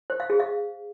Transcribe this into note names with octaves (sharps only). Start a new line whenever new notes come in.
C5
F5
G#4
F5